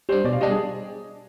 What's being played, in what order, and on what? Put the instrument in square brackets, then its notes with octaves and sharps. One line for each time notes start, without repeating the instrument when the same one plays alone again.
[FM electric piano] G3 D4 [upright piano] C5
[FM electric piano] B2 [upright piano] D5
[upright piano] F5
[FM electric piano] G3 D4 [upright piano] D#5
[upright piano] G#4